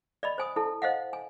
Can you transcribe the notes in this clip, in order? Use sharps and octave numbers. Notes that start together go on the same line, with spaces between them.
D5 D#5 B5
C5 G#5 D#6
E4 A4 A5
C5 D#5 F5 F#5
G#5